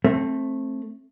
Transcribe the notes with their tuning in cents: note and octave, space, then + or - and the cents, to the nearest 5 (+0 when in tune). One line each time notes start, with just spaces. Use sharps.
A3 +0 C4 +20